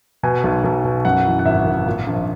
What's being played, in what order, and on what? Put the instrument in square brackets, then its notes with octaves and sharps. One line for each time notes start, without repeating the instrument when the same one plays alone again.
[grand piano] B2 G#5
B1
B1
B2
F#2 F#5
E3
F#5
G#1 E5
G#1
A#2
A#1